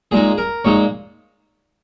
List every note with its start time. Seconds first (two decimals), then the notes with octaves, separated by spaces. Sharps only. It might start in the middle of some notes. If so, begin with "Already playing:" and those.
0.11 A#2 G#3 D#4 G#4
0.38 A#4
0.65 A#2 G#3 D#4 C#5